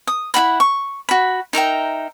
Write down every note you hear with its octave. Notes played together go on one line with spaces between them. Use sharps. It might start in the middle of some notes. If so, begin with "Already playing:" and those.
D#6
E4 F4 F#5 B5
C#6
F#4 B5
D#4 A#4 E5 G5